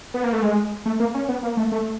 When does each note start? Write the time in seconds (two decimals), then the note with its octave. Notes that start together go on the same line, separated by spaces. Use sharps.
0.14 B3
0.24 A#3
0.33 A3
0.42 G#3
0.86 A3
1.00 A#3
1.14 C#4
1.29 B3
1.43 A#3
1.57 A3
1.72 A3